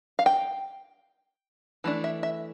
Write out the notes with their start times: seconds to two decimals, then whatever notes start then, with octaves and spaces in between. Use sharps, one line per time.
0.19 F5
0.26 G5
1.84 E3 A3 D4
2.04 E5
2.23 E5